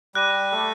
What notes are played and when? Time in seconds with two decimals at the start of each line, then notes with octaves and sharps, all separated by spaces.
0.15 G3 G4 F#6 A#6 D#7
0.52 A3 A4